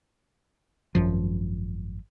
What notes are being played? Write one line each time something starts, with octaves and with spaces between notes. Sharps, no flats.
G#1 F#2 F3